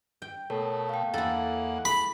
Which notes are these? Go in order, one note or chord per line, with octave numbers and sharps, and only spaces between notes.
G5
B2 A3 A4 A#4 C#5
F5 G5
E2 A#3 E4 A4 F5 F#5
G#4 B5